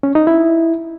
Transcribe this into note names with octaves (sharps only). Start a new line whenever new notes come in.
C#4
D#4
E4